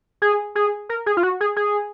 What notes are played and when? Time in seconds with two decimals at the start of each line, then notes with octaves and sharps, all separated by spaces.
0.22 G#4
0.55 G#4
0.89 A#4
1.06 G#4
1.17 F4
1.23 F#4
1.41 G#4
1.56 G#4